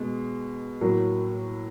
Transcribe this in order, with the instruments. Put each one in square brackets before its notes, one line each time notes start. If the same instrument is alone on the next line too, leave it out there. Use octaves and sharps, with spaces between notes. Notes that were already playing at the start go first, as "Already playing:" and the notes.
Already playing: [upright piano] B2 G#3
A2 F#3 A#3